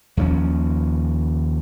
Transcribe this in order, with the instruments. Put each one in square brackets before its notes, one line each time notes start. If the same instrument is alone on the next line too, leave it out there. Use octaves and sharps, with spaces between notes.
[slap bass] D#2 F3 C4 C#4